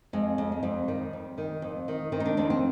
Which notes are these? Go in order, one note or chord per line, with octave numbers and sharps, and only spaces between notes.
F2 G#3
F2
G#3
F2 G3
D#3 G3
F2
D#3
F2
D#3
D#3 C4
D#4
D4
F2 D4
C4